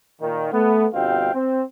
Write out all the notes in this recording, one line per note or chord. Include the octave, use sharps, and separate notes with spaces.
A#2 D#3
A3 B3
G1 G2 B2 C4 F5 G5
C4